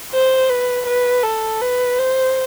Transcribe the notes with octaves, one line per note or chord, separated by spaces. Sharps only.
C5
B4
B4
A4
B4
C5